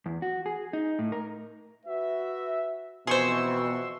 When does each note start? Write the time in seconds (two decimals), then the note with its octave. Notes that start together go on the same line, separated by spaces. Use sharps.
0.06 E2
0.22 F#4
0.46 G#4
0.73 D#4
0.99 A2
1.12 A#4
1.86 F#4 B4 E5
3.07 F2 B2 E3 G#4 C5 C6 C#6 E6